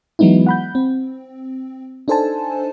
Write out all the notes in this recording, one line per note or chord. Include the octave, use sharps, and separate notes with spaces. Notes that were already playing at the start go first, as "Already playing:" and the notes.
E3 F#3 G#3 B3 D#4 E4
F#5 B5 G6
C4
D4 D#4 A4 C5 G#5 A5